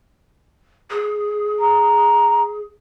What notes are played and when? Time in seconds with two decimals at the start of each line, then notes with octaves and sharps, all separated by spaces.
0.90 G#4
1.59 A#5